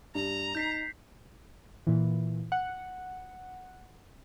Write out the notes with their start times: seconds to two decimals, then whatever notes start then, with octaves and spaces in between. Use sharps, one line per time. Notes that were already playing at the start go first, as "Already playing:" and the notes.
0.15 G2 A#5
0.55 D#4 G6 B6 C7
1.87 A#2 E3
2.52 F#5